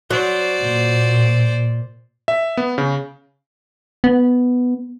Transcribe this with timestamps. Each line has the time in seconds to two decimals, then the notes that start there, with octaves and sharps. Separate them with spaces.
0.11 F#3 C5 D5
0.60 A#2
2.28 E5
2.57 B3
2.78 C#3
4.04 B3